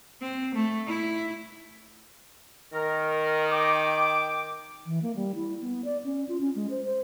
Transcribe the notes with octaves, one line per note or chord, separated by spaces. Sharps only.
C4
A3
E4
D#3 A#4
G5 D6
E3
A#3
G3
E4
B3
D5
C#4
F4
C#4
G#3
C5
C5